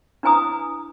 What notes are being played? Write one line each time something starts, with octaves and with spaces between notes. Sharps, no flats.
D4 E4 B4 G#5 A#5 D#6